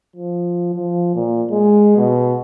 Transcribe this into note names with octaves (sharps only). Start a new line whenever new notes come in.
F3
F3
A#2
G#3
B2